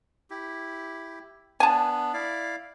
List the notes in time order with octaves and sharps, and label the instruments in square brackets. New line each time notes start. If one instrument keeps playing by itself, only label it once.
[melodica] E4 G4
[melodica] B3 D4 [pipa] G#5 A5
[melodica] E4 D5 F5